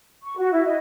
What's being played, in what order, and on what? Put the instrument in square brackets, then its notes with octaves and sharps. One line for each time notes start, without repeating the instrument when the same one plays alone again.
[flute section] C#6
F#4
E4
D#5